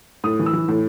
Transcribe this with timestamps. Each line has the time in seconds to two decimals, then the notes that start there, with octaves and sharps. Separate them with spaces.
0.24 A2 D#6
0.39 E3
0.46 E6
0.53 E3
0.68 A2